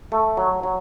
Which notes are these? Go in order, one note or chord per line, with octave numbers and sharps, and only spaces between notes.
A3
F#3
F#3